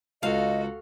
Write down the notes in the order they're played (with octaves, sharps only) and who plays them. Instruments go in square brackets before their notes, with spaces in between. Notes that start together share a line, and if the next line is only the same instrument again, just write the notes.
[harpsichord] C#2 [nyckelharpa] F#4 A4 [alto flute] D#5 [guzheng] F5